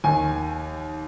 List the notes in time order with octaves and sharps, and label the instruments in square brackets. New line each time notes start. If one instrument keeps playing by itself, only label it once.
[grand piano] D#2 D#3 G#5